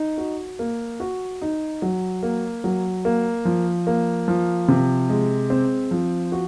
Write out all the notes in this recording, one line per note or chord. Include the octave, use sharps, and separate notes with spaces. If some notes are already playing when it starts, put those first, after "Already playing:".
Already playing: D#4
F#4
A#3
F#4
D#4
F#3
A#3
F#3
A#3
F3
A#3
F3
C3
G#3
C4
F3
F#4